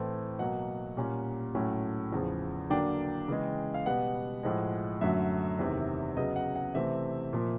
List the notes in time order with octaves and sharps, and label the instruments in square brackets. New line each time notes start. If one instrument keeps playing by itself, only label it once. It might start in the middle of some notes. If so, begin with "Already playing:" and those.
Already playing: [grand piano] A2 E3 A3 C4
B2 F#3 A#3 F#5
A#2 G3 A#3 C#4
A2 F#3 A3 C#4
E2 C#3 F3
D3 F#3 A#3 D4 G5
C#3 E3 G#3
F5
B2 G3 B3 F#5
A2 F3 G#3
F#2 D3 F#3 A3 E5
E2 C3 D#3
C#3 F#3 B3 D#5
F#5
F#5
C3 E3 A3 C4 E5
A#2 F3 A#3